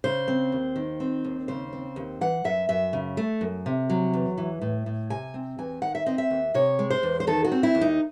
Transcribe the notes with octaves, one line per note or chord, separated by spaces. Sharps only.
C#3 C5
C4
D#2
D#3
C4
D#2
C#3 C5
C4
D#2
E3 F#5
F#2 E5
F#2 E5
C#3
A3
F#2
C3
F#3
E2
E3
A2
A2
C3 G#5
C4
E2 G#5
D#3 F#5
E5
C4 D#5
E5
D#2
C3 C#5
G#3
C5
E2
C5
D#3 A4
F#4
C4
E4
D#2
D#4